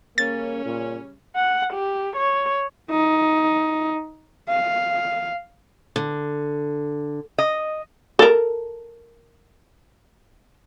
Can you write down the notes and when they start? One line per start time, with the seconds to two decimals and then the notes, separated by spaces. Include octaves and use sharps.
0.18 C#3 G3 A#3 C#4 A6
0.65 A#2
1.36 F#5
1.74 G4
2.17 C#5
2.90 D#4
4.49 F5
5.96 D3
7.38 D#5
8.19 A4 A#4